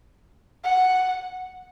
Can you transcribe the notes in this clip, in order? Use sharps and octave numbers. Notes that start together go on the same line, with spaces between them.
F#5